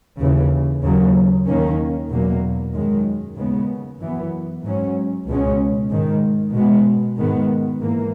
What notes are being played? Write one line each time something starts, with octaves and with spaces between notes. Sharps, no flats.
D#2 C#3 E3
D#2 C#3 F#3 A#3
D#2 D#3 A#3 C#4
E2 B2 F#3 A#3
F#2 D#3 G#3
D#2 C#3 G#3 B3
F#2 E3 B3
G#2 F#3 C#4
C#2 B2 G#3 C#4
G#2 D#3 G#3
B2 G#3 B3
G#2 D#3 G#3 B3
G#2 E3 A#3